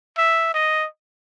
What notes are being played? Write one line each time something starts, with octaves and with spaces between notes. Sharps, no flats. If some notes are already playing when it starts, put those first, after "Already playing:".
E5
D#5